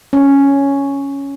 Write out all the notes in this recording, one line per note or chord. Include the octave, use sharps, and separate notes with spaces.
C#4